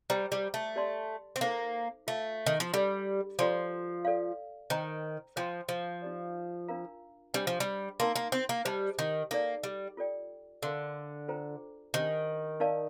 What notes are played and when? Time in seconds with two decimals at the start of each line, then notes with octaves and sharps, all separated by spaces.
0.10 G3 G4 C5 G5 A#5
0.32 G3
0.54 A3
0.76 G4 D5 A5 C6
1.36 C4
1.41 A#3 D#4 A4 C5 D#5
2.07 A3 F4 C5 F5
2.47 D#3
2.60 F3
2.73 G3 D4 A4 D5
3.39 F3 F4 A4 D5 G5 C6
4.05 A4 D5 F5
4.70 D#3 C5 G5 A#5
5.36 F3 C5 G5 C6
5.69 F3
6.02 D#4 G4 D5
6.68 D4 F4 A#4 F5 A#5
7.34 G3 D4 G4 C5 G5
7.47 F3
7.60 G3
8.00 A#3 D#4 A#4 D#5 A5 C6
8.16 A#3
8.32 C4
8.49 A#3
8.65 G3 C5 D#5 A5
8.99 D#3
9.31 A#3 D#4 A4 D5
9.64 G3
9.97 F4 A4 D5 G5
10.63 D3 A#4 F5 C6
11.28 F4 A4 C5 G5 A#5
11.94 D#3 D4 G4 C5
12.60 D#4 A#4 D5 F5 A5